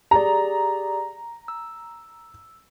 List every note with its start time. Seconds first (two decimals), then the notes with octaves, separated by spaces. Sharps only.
0.11 G4 G#4 D5 A#5
1.48 E6